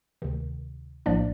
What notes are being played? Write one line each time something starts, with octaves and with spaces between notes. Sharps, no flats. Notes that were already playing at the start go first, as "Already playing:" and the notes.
D2 C3 D#3
A#1 A2 F3 A#3 D4 D5